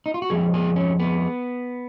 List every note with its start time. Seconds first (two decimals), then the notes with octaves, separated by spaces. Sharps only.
0.06 D#4
0.14 F4
0.22 F#4
0.30 F2 F3 G#3 G#4
0.54 G#4
0.76 C#4
0.99 B3